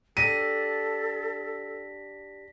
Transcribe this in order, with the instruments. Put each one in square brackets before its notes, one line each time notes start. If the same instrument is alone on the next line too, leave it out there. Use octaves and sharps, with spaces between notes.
[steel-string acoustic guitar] D4 G4 [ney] A4 [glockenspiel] A#6 B6 [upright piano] D#7